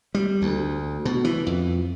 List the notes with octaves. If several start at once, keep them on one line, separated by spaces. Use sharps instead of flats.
G3
D2
B2
E3
F2